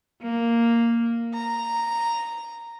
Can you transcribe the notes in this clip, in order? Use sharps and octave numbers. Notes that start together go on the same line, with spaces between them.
A#3
A#5